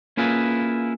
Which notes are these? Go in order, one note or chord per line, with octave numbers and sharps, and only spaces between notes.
A#3 C#4 E4 F4 G#4 B4